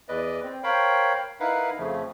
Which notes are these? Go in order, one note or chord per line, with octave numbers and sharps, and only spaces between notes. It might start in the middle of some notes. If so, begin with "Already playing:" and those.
E2 B4 D5 D#5
C4
A#4 C5 C#5 F5 G5 B5
D#4 E4 A#4 B4 F5 F#5
F2 C#3 F3 A3